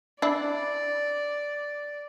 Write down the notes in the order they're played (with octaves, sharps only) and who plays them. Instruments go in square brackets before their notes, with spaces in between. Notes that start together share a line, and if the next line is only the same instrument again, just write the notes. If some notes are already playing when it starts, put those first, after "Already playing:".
[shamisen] D4 E4 [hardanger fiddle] D5